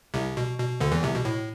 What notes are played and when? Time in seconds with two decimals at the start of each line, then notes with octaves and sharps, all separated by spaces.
0.14 C2 C3
0.37 B2
0.59 B2
0.80 D2 D3
0.92 E2 E3
1.03 C2 C3
1.15 B2
1.25 A2